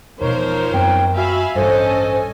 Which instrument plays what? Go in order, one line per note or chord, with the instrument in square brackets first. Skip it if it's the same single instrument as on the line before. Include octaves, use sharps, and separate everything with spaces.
[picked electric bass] E1 B2 [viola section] F3 C5 [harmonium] D#4 A#4 C#5
[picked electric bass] F#2 B3 C4 [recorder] G5
[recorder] F#4 [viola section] E5 F5 B5 [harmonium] G#5
[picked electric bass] A1 G2 [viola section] C#4 A4 D#5 [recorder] C5